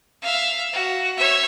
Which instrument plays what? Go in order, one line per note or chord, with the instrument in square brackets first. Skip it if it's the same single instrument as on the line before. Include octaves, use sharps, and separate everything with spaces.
[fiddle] E5 F5
F#4
C#5 E5